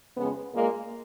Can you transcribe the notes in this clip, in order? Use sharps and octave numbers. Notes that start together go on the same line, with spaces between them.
F2 C#3 G#3 B3
A#2 G#3 A#3